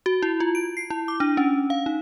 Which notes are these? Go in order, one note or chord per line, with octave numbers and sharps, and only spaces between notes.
F#4
E4
F4
D7
C7
E4
D6
D4
C#4
F5
D#4